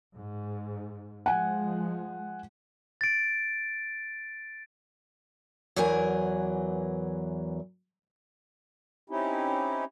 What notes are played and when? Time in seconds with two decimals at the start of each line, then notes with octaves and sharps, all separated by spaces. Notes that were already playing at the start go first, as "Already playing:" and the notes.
0.15 G#2
1.26 F3 G#3 F#5 G#5
3.01 A6 D7
5.76 E2 E3 F#3 A#4 G#5
9.10 C4 C#4 D#4 E4 G4